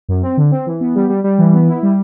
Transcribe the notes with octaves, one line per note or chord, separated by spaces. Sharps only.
F#2
C4
D3
C4
E3
B3
G3
G3
G3
E3
B3
E4
G3